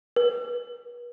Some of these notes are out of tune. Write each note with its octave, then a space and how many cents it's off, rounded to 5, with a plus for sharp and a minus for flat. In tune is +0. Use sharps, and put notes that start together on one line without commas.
B4 -40